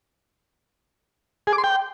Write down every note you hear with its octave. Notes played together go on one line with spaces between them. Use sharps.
G#4
D6
C6
G5